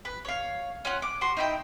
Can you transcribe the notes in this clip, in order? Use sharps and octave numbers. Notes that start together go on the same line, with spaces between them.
B4
C#5 F5
C#4 F4 F#5
D6
F#4 C6
D#4 E4 G5